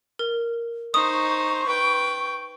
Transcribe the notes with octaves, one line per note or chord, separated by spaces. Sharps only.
A#4
D#4 C5 C#6 D#6
B4 G5